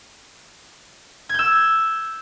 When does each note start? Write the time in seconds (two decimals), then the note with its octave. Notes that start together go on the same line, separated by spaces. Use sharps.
1.29 G#6
1.34 G6
1.39 E6